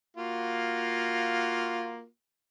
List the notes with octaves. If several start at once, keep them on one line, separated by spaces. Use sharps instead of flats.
A#3 F4 F#4